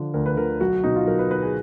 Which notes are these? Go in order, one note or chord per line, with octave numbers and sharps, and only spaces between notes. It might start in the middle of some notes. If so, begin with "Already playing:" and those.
Already playing: D3 F3
D2 A#4
B4
D3 F3 A#4
B1 F#4
B2 D#4
F4
B1 A#4
B4
B2 B4
G#4